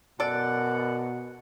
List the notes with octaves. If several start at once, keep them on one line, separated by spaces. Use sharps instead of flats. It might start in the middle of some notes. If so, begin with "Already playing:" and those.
F#2 B2 A4 D5 F#5